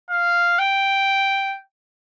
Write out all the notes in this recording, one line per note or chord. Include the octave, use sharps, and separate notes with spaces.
F5
G5